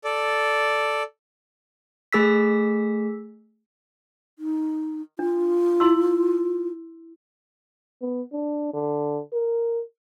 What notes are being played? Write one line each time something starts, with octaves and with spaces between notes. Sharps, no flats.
A4 D5
A3 G#4 E6 B6
D#4
D4 F4
E4 C6 E6
B3
D4
D3
A#4